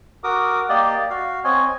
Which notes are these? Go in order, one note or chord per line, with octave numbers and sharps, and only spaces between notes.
F#4 A#4 D6 D#6
A#3 G4 D5 D#5
F#4 F5
C4 C#5 D#5 G#5